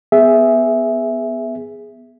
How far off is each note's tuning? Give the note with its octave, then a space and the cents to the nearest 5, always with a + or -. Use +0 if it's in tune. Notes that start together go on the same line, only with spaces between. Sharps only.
B3 +0 G#4 +0 E5 +0